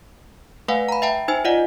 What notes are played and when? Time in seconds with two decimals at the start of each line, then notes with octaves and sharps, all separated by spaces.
0.68 A3 B4 F5 F#5 G#5
0.89 A#5 B5
1.02 E5 G5 A5
1.28 D#4 C5 G#5
1.45 F4 D5 D#5 F#5